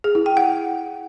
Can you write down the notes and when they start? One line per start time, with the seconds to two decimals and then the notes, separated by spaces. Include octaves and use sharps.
0.04 G#4
0.15 E4
0.26 G5
0.37 F#5